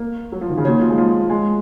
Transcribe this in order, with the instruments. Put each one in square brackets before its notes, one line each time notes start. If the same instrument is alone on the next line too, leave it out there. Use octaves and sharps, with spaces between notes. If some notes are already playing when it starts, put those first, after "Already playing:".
Already playing: [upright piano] A#3
F#3
F3
D#3
C#3
[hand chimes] A#3 D#4 F#4 C#5
[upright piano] F3
G#3
F3
G#3